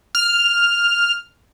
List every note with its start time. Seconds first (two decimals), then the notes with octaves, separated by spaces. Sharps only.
0.15 F6